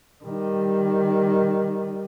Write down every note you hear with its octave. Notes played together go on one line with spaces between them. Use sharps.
D#3 G3